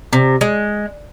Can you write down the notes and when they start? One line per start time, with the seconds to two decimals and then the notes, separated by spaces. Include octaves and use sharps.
0.13 C3
0.41 G#3